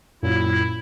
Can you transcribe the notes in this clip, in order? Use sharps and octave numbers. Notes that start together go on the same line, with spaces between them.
F#2 A#2 E4